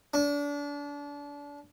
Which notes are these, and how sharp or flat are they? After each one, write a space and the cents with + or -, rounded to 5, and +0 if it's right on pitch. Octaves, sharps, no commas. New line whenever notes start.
D4 -30